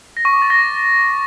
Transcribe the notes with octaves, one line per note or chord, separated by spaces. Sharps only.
A#6
C#6
D6
A6
A#6